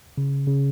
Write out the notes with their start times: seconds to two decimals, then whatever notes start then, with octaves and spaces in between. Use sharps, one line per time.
0.18 C#3
0.47 C#3